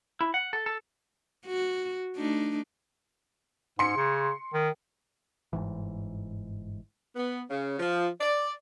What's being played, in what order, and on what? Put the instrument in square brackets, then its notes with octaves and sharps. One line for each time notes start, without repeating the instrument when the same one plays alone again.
[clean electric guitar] E4
F#5
A4
A4
[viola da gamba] F#4
A3 D4 D#4
[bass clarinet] G#2 [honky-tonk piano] C6 C#7
[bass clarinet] C#3
D#3
[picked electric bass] G1 G#2 E3
[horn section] B3
C#3
F3
D5